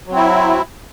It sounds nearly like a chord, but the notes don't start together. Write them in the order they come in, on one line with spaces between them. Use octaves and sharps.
F#3 C4 E4